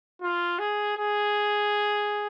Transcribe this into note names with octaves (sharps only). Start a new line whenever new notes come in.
F4
G#4
G#4